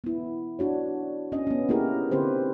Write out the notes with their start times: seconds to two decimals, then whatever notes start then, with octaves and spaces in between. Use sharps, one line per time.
0.04 B3 E4
0.59 D4 F#4 C#5
1.32 C#4 D4 D#5
1.47 B3 C#4
1.69 A#3 D#4 E4 G4 G#4 A#4
2.11 D3 C4 G4 B4 C5